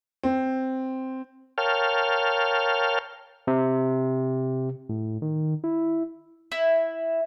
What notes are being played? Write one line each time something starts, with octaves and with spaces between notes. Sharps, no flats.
C4
A#4 C#5 F5 G5 A5 F6
C3
A2
D#3
E4
E4